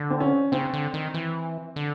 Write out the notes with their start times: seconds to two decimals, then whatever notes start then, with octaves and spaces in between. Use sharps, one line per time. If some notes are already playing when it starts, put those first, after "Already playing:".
Already playing: D3
0.10 C4
0.20 C#4
0.52 C#3 C4
0.73 D3
0.94 D#3
1.14 E3
1.76 D3